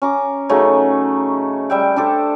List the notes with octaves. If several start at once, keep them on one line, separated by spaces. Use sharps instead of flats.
C#4 A#5 D6
C#3 F#3 A3 D#4
G3 E5 G5
D4 G4 A4 C5